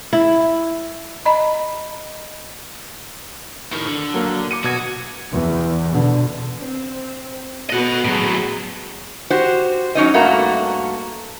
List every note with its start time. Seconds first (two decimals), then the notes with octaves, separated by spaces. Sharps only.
0.13 E4
1.25 D#5 A#5 B5
3.72 A2 D#3
3.87 D3
4.14 F#3 A#3
4.51 D6 C#7 D#7
4.64 B2 F#4 G#6 D#7
5.31 E2
5.92 B2 D3
6.60 C4
7.70 B3 F#4 A4 D#5 F#5
8.05 A2 F#3 G#4
9.30 F#4 G4 C5
9.95 F#3 C#4 D#4 D#5
10.14 G2 A3 A#3 F#4 A#5